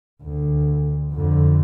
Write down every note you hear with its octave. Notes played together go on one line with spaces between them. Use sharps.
D2
F2 D3